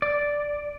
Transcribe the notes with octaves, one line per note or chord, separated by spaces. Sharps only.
D5